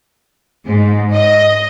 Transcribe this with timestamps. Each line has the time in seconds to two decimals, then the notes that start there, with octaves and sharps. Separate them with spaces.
0.66 G#2
1.13 D#5